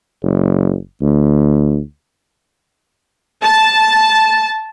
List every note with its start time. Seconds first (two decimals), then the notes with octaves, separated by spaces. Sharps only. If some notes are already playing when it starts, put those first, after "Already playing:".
0.23 F#1
1.01 D2
3.44 A5